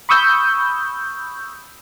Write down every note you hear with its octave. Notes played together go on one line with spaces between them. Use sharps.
B5 C#6 D#6 E6 G6